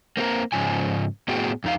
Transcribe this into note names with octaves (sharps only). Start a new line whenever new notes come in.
A#3 C4 F#4 A#4
G#2 C#3 F3 G#5
A2 B3 F#4 G#4 G5
F2 D#4 F5